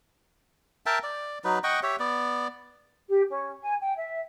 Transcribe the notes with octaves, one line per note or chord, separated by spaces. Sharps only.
A#4 E5 G5 A5
D5
F#3 D#4 B4
D#5 F#5 G5 C#6
G4 C#5 E5
B3 D5
G4
C#4
G#5
G5
E5